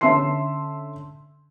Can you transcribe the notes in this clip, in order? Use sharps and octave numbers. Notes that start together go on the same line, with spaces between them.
D3 C#4 E5 A5 C6 C7